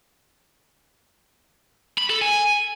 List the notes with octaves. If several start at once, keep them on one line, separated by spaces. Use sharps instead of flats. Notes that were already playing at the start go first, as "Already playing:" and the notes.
B5
A4
G#5